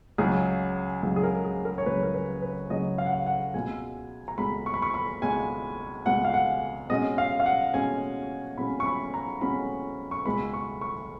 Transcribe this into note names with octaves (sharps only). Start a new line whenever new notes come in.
C#2 C#3 F#3 G#4
C#2 C#3 F#3
G#4
A#4
G#4
A#4
C#5
C#2 C#3 F#3 B4
A#4
B4
B4
C#2 C#3 F#3 D#5
F5
F#5
F5
F#5
C#2 B2 G#3 G#5
A#5
C#2 B2 G#3 B5
C#6
B5
C#6
B5
C#2 B2 G#3 G#5
C#2 B2 G#3 F#5
F5
F#5
B2 G#3 C#4 D#5
F5
F5
F#5
B2 G#3 C#4 G#5
B2 G#3 C#4 B5
C#6
B5
A#5
B2 G#3 C#4 B5
C#6
C#2 B2 G#3 B3 B5
C#6
C#6